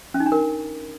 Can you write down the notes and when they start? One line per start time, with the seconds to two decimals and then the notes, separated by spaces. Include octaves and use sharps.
0.14 C#4
0.20 D#4
0.26 D4
0.32 A#4